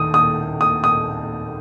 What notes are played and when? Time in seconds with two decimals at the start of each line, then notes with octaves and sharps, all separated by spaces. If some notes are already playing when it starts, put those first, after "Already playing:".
Already playing: D#2 D#3 D#6
0.14 D#6
0.61 D#6
0.84 D#6